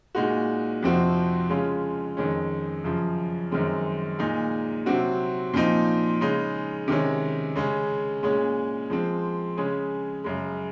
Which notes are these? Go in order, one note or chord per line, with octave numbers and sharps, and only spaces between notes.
A#2 G#3 D#4 F#4
F2 C3 F3 C4 F#4
C#3 G#3 C#4 F4
F2 D#3 G#3 C#4
F#2 C#3 F3
F#2 D#3 G#3 C4
A#2 G#3 D#4 G#4
C3 F#3 C4 F#4
A#2 F3 C4 D#4
C#3 G#3 D#4
C3 D#3 G#3 C#4
C#3 G#3 C#4
A#2 G#3 C#4 G#4
F3 G#3 C4
C#3 G#3 C#4 G#4
F#2 C#3 G#3